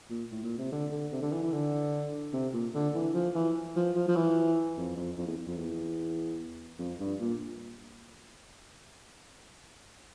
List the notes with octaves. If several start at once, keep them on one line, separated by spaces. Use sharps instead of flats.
A#2
A2
A#2
C3
D3
D3
C3
D3
E3
E3
D3
C3
A#2
D3
E3
F3
E3
F3
F3
F3
E3
F2
F2
F2
E2
F2
E2
F2
G2
A#2